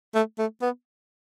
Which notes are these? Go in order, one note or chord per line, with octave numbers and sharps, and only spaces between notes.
A3
A3
B3